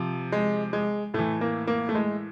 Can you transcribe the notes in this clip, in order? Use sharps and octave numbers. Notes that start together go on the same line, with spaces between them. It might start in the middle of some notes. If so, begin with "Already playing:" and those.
Already playing: C3 F3
G#3
G#3
A2 E3 A3
A#3
A#3
A3
G#3